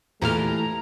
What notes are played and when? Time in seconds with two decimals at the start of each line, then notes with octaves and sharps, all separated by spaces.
0.22 E2 A#2 E3 A3 G4 A#5 F6